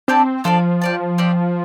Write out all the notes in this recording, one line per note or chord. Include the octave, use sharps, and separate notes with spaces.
C4 D4 G4 D5 A5
F3 D4 A4 D5 F5
G4 D5 A5
C4 G4 D5